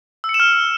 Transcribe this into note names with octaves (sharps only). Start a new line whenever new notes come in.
E6
C#7
E7
F6